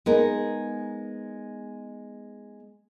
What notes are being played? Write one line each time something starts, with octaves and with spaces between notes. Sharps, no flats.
G#3 B3 D#4 A#4